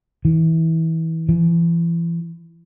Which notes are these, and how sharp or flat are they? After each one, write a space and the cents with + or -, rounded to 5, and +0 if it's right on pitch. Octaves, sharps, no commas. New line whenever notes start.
E3 -25
E3 +35